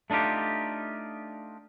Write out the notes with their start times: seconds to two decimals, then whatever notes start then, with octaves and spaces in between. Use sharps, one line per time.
0.10 A3 D4 D#4 F4 G4